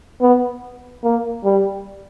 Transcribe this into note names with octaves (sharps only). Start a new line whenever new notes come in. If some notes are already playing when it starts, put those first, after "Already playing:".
B3
A#3
G3